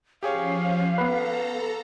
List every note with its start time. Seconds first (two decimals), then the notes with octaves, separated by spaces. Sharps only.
0.23 F3 C#4 G4 G#4 C#5 F5
0.98 B3 A4 B4 A#5